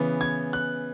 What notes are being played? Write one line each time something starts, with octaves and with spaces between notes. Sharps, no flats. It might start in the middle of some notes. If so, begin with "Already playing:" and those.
Already playing: C#3 E3 B3
G#6
F#6